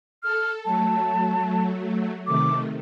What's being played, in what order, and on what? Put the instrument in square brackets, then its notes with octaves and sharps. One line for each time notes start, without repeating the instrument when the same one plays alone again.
[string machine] A4 [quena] F6
[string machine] F#3 A3 [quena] A5
[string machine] C3 D#3 A3 [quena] D6